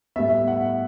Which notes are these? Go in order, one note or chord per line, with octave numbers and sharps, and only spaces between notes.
A2 G3 B3 E5
F#5